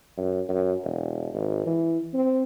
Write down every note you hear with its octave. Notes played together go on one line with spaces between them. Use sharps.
F#2
F#2
E1
G#1
E3
C4